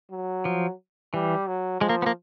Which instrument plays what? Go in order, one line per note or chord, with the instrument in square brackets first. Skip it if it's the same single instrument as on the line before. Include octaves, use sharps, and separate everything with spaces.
[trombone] F#3
[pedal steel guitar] F3
[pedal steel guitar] E3 [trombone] G3
[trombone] F#3
[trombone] F3 [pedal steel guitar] G#3
[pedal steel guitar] A#3
B3
A#3